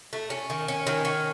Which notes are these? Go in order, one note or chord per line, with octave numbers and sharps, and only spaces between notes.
A3
C#4
D#3
C#4
D#3
C#4